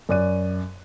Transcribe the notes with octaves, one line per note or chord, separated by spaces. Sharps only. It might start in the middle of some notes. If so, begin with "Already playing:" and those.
F#2 D5 F#6 D#7